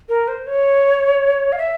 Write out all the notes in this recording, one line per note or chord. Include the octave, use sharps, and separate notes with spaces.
A#4
C5
C#5
F5
E5